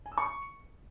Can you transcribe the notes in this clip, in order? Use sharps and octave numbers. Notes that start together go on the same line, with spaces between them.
G#5
E6
C#6